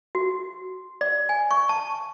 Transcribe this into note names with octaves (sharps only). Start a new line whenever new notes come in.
F#4
D5
G#5
C#6
A5